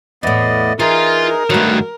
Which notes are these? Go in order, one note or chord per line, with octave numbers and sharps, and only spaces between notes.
E2 A2 B3 D5 D#5
E3 D#4 F4 G#4 A#4 C6
G2 D#3 F#3 A3 B4